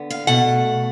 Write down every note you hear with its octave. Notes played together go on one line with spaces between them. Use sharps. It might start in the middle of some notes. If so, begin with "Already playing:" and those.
Already playing: D3 B3
F5
B2 A3 F#5